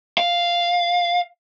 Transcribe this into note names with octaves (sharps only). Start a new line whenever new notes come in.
F5